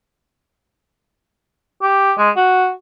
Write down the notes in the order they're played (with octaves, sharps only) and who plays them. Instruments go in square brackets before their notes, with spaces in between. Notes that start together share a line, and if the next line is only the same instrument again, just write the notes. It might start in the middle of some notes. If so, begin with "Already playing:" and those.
[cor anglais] G4
G#3
F#4